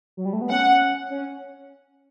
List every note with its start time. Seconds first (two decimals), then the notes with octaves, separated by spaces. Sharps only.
0.17 F#3
0.25 G3
0.33 A3
0.41 B3
0.50 C#4 F#5
1.10 C#4